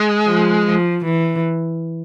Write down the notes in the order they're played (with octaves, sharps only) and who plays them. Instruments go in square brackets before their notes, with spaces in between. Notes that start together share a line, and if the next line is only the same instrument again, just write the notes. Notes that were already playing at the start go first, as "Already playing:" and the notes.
Already playing: [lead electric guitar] G#3
[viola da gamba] F3
F3
E3